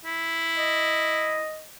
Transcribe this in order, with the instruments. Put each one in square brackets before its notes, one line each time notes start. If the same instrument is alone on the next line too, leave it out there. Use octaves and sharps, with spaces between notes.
[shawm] E4
[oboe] D#5